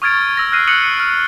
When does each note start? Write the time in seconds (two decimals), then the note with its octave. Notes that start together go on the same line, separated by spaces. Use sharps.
0.02 C#6 D#6 F6 G#6 A6 D7
0.37 E6 A#6
0.52 F6 F#6 A#6 C7 D#7
0.68 D#6 F#6 C#7 D#7 F#7
1.00 F6